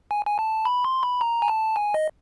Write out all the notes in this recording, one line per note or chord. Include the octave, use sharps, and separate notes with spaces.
G#5
G#5
A5
B5
C6
B5
A#5
G#5
A5
G#5
D#5